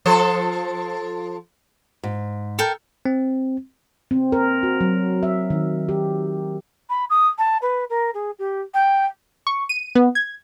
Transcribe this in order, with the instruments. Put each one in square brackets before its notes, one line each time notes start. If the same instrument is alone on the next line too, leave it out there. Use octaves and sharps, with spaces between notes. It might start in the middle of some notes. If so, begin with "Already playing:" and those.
[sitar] F3 A4 C5
[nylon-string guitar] G#2
[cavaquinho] A4 A#4 G5
[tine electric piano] C4
[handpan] C4
A#4
F#4
F#3
E5
D#3
G4
[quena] B5
D#6
A5
B4
A#4
G#4
G4
G5
[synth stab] C#6
D#7
B3
G#6